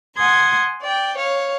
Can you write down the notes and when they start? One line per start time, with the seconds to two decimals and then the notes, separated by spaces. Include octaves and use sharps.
0.17 F#5 G#5 C6 D#6 G#6
0.81 D5 G5
1.17 C#5 F5